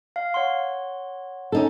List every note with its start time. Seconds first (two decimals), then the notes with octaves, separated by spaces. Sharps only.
0.16 F5
0.34 C#5 F#5 C6
1.52 C#4 D#4 A4